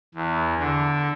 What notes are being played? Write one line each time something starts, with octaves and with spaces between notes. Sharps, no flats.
E2
D3